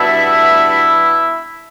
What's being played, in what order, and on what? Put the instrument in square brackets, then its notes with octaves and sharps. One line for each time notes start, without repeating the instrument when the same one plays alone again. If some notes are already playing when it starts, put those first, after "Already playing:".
Already playing: [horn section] B2 G3 B3 D4 E4 E5